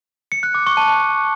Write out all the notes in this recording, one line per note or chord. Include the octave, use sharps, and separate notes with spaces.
C#7
F#6
D6
C#6
A5